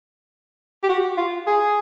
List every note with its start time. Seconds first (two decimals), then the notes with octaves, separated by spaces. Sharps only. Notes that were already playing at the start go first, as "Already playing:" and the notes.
0.83 G4
0.89 F#4
1.17 F4
1.47 G#4